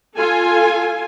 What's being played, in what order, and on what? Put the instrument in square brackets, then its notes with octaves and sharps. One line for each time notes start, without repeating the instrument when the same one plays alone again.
[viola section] F4 A4 G#5